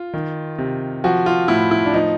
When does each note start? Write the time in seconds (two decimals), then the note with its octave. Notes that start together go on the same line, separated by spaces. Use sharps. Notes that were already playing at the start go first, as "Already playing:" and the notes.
Already playing: F4
0.14 D#3
0.58 C3
1.04 F3 F#4
1.26 F4
1.48 A2 E4
1.71 E4
1.86 D4
1.94 F3 D#4